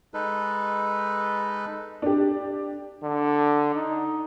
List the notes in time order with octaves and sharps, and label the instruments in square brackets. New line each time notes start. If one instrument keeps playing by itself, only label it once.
[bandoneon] G#3 D#4 A4 B4
[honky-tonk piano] D4 G4
[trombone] D3
D#4